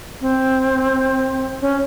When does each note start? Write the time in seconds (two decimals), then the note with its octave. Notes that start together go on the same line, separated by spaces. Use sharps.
0.21 C4
1.61 C#4